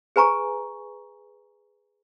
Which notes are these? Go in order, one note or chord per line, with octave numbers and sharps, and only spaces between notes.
G#4 B4 G#5 A#5 C#6